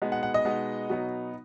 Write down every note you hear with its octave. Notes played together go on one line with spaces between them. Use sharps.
B2 G#3 B3 D#4
F#5
F#5
D#5
B2 G#3 B3 D#4
B2 F#3 B3 D#4